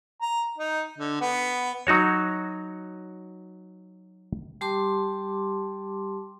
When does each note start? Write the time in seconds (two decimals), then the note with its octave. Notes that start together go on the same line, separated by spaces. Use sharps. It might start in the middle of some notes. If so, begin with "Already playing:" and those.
0.22 A#5
0.58 D#4
0.98 D3
1.21 B3
1.87 F#3 D#4 F#4 C#5
4.61 G3 G4 A5 C6 D6